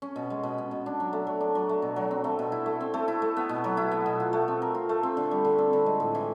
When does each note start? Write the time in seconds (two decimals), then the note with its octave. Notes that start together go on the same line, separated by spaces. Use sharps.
0.02 C#4
0.16 B2
0.30 G#3
0.43 B2
0.58 C#4
0.71 B2
0.86 D4
1.00 F#3
1.13 A3
1.27 F#3
1.41 D4
1.55 F#3
1.69 A3
1.82 B2
1.96 F#3
2.11 C4
2.24 A3
2.39 B2
2.52 E4
2.66 A3
2.81 C4
2.94 A3
3.08 E4
3.22 A3
3.37 B3
3.49 B2
3.64 F#3
3.77 E4
3.91 B3
4.06 B2
4.20 F4
4.33 A3
4.48 C4
4.62 A#4
4.75 F4
4.89 A3
5.03 C4
5.17 D3
5.31 G3
5.45 D3
5.58 C4
5.73 D3
5.86 G#3
6.00 A2
6.15 E3